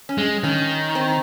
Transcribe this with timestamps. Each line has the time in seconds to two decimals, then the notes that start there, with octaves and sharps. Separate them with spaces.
0.09 C#4
0.18 G#3
0.43 D#3 C#4
0.95 C4